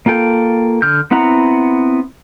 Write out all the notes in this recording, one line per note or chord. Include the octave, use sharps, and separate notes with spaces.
A#3 F4 A4 G5
D3 F6 G6
B3 C4 E4 F#5 A#5